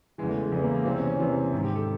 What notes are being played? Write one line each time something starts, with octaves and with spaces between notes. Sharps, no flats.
E2 C#3 E3 G#3
A3
G#3
E2 C#3 E3 G#3
A#3
A#3
E2 C3 E3 C4
C#4
C#4
E2 C3 E3
G#2 D#3
G4
A4